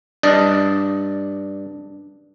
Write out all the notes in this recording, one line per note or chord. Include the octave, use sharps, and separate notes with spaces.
G2 D4 D5 D#5